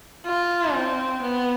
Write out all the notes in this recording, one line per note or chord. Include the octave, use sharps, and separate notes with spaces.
F4
C4
B3